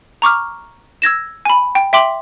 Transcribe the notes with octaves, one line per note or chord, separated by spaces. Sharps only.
A#5 C#6 D6 F6
E6 G#6 A#6 E7
G#5 B5
G5
E5 G5 C6 D6 F#7